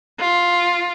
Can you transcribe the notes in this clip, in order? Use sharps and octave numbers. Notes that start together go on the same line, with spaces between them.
F4